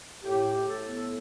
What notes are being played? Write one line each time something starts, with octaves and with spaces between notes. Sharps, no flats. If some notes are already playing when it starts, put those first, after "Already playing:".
A2 G4
A2
A4
B3